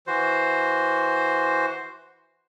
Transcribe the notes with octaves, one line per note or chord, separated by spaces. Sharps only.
E3 F#4 C5